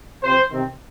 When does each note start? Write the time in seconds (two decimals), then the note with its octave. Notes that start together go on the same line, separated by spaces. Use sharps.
0.23 C3 F3 C4 C5
0.51 C3 D#3 C4